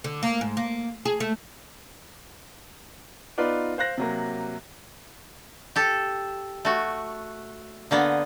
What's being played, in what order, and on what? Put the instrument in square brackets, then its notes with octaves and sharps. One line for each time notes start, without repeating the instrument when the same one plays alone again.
[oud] D3
A#3
G#2
A#3
G#4
A3
[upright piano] B3 D#4 F4 B4 D5
C5 F5 F#6 A#6
C3 F#3 A#3
[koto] G4 A4
A3 F#4
D3 A#3 B3